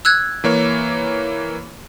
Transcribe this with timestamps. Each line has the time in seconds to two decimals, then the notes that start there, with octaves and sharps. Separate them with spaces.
0.05 E6 F#6 G#6
0.44 E3 A#3 C#5